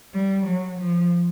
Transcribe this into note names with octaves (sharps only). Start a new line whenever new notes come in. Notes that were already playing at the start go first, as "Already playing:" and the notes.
G3
F#3
F3